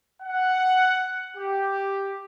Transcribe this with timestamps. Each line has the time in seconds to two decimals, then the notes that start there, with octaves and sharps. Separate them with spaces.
0.22 F#5
1.37 G4